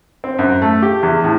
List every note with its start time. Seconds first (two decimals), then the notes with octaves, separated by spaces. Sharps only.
0.24 C4
0.39 F#2
0.62 A3
0.82 G4
1.03 E2
1.24 A2